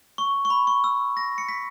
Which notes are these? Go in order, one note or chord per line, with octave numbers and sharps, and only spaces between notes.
C#6
C#6
B5
C#6
E6
A#6
C#7
B6